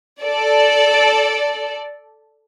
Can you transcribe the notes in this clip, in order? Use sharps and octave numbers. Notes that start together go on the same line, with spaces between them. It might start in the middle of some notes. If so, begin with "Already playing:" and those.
A4 D5